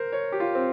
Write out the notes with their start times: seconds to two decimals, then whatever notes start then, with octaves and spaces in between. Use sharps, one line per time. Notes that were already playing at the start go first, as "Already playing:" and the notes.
Already playing: A#4 C5
0.12 C#5
0.32 G4
0.40 F4
0.55 C4